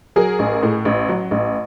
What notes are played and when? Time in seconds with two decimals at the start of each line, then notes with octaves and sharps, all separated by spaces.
0.16 F#3 G#4 A#4
0.39 A1
0.63 A2
0.85 A1
1.09 F#3
1.31 A1